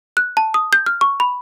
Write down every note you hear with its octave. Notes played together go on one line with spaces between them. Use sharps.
F#6
A5
D#6
G6
F6
C#6
B5